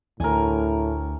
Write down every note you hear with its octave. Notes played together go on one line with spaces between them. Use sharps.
D2 A2 A#4 G#5